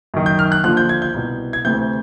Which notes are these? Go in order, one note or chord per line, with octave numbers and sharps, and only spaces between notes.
F#2 D#3
G6
F6
F#6
D#2 D3 F3 F#6
G6
G#6
G6
C2 B2
G#6
D2 C3 E3 G6